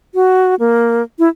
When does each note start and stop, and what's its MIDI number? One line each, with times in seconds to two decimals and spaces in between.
0.14 0.55 66
0.60 1.03 58
1.19 1.29 64